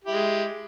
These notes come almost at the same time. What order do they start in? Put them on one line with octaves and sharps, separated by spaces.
G4 E4 G#3